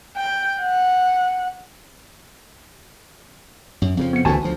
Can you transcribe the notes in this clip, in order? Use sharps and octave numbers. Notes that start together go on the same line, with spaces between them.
G5
F#5
F#2
F2 C#3 F3
B3 C#7
D2 D3 E3 F#4 G#5 A5
D2 F3